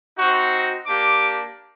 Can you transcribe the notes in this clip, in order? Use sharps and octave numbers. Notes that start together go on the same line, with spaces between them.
C4 D#4 F#4
A#3 D4 G4 D6